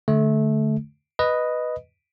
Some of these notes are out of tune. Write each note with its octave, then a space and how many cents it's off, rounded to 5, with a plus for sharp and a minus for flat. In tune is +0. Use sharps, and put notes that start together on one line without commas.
D3 +0 A3 -20
B4 +0 D#5 +0